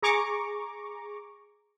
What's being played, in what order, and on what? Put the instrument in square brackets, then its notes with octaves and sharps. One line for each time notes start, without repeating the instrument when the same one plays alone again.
[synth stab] G#4 A#5 C#6 D6